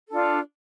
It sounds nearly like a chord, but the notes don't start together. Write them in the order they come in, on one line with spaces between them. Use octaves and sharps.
A4 D4 F4